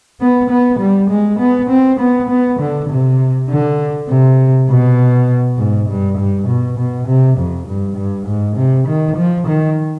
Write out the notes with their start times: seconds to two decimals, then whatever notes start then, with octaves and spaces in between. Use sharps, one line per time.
0.20 B3
0.50 B3
0.79 G3
1.10 G#3
1.39 B3
1.70 C4
1.99 B3
2.29 B3
2.60 D3
2.89 C3
3.49 D3
4.09 C3
4.69 B2
5.57 G#2
5.88 G2
6.18 G2
6.47 B2
6.78 B2
7.07 C3
7.38 F2
7.67 G2
7.97 G2
8.27 G#2
8.56 C3
8.88 D#3
9.17 F3
9.47 D#3